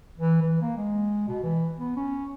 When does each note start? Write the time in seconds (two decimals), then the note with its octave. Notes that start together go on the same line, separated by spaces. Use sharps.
0.18 E3
0.42 E3
0.61 A#3
0.77 G#3
1.28 B2
1.44 E3
1.79 B3
1.96 C#4